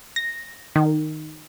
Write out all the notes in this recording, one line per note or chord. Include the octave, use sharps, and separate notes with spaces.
A#6
D#3